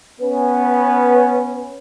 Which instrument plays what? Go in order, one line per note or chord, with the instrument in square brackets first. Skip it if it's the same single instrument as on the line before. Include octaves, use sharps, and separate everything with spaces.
[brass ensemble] B3 C#4 B4